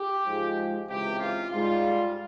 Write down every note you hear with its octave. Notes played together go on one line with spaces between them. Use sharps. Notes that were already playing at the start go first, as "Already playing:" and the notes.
Already playing: G4
G#2 F3 G#3
C#2 C3 E3 G4
F4
G#2 G3 F4